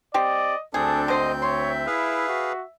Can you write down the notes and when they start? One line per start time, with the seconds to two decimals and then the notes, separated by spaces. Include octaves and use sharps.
0.14 C4 G4 D5 D#5
0.74 D2 C4 D4 G#4 A4 G6
1.08 D3 G#3 C5 D#5
1.42 C#5 E5 C6
1.87 E4 G#4 B4 F5
2.28 F#4